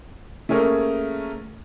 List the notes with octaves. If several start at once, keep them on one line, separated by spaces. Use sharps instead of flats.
A3 A#3 C#4 G#4 A#4